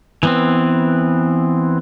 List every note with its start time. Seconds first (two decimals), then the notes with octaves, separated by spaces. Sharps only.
0.23 E3 B3 C4